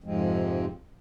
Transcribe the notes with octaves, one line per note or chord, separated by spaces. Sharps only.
F2 G#2 C3 F3 G#3 C4